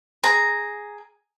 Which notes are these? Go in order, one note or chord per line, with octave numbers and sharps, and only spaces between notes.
G#4 A#5